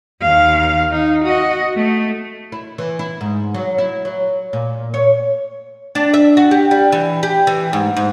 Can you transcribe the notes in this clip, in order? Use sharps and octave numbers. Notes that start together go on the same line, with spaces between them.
D#2 F5
D#4
F#4 D#5
A3
E4
E3
E4
G#2
F#3
E4
F#3
A#2
C#5
D4
E5
F#4
G4
G3
E3
G4
E3
G#2
G#2